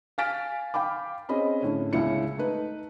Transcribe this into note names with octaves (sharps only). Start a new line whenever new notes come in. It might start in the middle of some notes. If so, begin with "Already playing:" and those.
F5 G#5 F6 A6 B6 D7
F5 G5 B5 D6
C4 C#4 G#4 D#5 B5
A2 D3 C#4
C#2 C#3 D4 E4 C#7
A3 D#4 B4